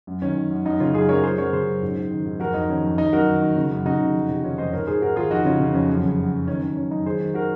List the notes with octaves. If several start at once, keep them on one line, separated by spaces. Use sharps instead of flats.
F#2
D#3 C#4
D#3
F#2
F#2 D#4
C#3 C#4 F4
F#2 F4 G#4
F#2 A#4 C#5
F#2 G#4 C5
F#2 A#4 C#5
C#3 G#4 C5
F#2
G#2
G#2
D#3
G#2
F2 F#4 A#4
F2 D#4
D#3 C#4
F2
D#3 D#4
F#2 F#4 A#4
D#3
D#3
C#3
F#2
C#3 D#4 F#4
C#3
F2
C3
D#3 C#4 F4
F2 C5 D#5
G#2 A#4 C#5
G#2 G#4 C5
G#2 F#4 A#4
D#3 F4 G#4
F2 D#4 F#4
C#3 C#4 F4
C#3
F2 C#4
F#2
C#3
F#2
F#2
D#3 C#4
D#3 C#4
F#2 C#4
F#2 D#4
D#3 G#4 C5
D#3
F#4 A#4